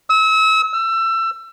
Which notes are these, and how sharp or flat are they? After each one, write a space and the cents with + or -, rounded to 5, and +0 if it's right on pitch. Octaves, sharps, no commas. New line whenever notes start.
E6 -35
E6 +25